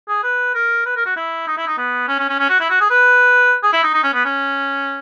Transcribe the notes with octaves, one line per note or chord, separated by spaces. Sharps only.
G#4
B4
A#4
B4
A#4
F#4
E4
D#4
E4
D#4
B3
C#4
C#4
C#4
C#4
F#4
E4
F#4
G#4
B4
G#4
E4
D#4
D#4
C#4
B3
C#4